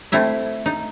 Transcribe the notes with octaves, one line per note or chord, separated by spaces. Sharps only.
A3 C4 E4 E5
D#4